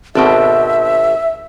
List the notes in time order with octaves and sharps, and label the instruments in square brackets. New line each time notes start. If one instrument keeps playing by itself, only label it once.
[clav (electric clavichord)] G#1 B2 [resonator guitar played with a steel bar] B3 C4 A4 [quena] E5